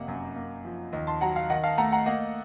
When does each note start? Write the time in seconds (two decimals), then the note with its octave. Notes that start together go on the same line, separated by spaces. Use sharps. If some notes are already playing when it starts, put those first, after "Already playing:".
Already playing: F1 C3 A#3 D#5 F#5
0.08 F#2
0.36 A#3
0.65 F3
0.93 D#2 D#5
1.07 A5 C6
1.21 F#3 F#5 A#5
1.36 F5
1.50 D#3 D#5 F#5
1.64 F5 A5
1.78 A3 F#5 A#5
1.92 F#5 A#5
2.06 A#3 D#5 F#5